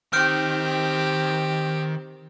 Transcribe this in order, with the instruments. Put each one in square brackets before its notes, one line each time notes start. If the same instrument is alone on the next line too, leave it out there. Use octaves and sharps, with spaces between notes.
[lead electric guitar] D#3 [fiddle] C4 G4 [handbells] F6 G6 D7